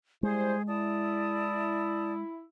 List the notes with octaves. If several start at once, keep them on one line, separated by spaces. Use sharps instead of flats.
G3 G#3 E4 G#4 C5
E4 D5 A5 D#6